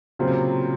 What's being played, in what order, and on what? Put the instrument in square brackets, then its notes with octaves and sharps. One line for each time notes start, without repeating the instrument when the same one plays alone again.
[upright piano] A#2 [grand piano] C#3 F#3 C4 F4 C5
[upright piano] C3